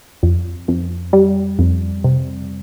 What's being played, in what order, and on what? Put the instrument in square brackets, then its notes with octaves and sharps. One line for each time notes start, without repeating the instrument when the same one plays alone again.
[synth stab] F2
F2
G3
F2
C3